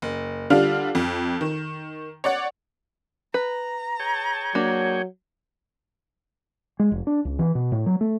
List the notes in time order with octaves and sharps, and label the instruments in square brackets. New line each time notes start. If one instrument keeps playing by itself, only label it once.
[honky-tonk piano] F#1
D3 G3 D4 F4 F6
F2
D#3
C#5 D5 F#5
[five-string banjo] B4 [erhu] A#5
[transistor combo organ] G#4 C#5 G5
[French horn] F#3 [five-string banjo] A#3 D4
[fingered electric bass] G#3
F1
D4
C#2
E3
B2
A2
F#3
A3